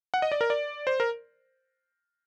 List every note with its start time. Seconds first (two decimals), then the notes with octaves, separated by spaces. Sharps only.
0.14 F#5
0.22 D#5
0.32 D5
0.41 A#4
0.50 D5
0.87 C5
1.00 A#4